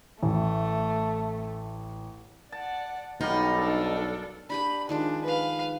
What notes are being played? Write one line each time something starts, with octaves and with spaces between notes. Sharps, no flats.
A1 A3
D5 F#5 A5
B1 G3 D#4 F4 F#5
D4 A4
D4 G4 B4 B5
D#3 F3 G#3 D4
B4 F5